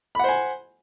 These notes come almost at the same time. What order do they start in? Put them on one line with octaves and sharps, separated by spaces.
B5 F#5 C5 G#5